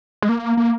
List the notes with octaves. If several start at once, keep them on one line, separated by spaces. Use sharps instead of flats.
G#3
A#3
A#3